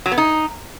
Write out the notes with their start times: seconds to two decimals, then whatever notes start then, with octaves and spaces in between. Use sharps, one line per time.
0.06 F#3
0.12 B3
0.18 D#4